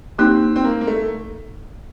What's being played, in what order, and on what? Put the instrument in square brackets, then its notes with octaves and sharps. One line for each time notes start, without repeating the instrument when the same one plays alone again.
[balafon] A#3 D#4 G4 [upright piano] C4
[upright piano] C4
A#3
A#3
A3